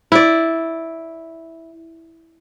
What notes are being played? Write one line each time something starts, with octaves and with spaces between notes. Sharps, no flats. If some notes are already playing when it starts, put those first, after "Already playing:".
E4 D5